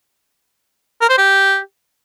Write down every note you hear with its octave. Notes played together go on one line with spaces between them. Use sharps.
A#4
C5
G4